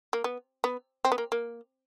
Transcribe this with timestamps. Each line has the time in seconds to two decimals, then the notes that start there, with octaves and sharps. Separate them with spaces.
0.13 A#3
0.24 B3
0.64 B3
1.05 C4
1.12 B3
1.18 A#3
1.32 A#3